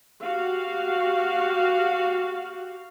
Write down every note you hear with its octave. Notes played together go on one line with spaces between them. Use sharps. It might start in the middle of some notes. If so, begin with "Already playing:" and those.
F#4 G4 F5